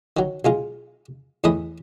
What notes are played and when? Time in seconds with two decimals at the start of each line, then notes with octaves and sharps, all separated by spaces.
0.17 D#3 F#3
0.45 B1 G#3 F4
1.44 E2 A2 E3 D#5 B5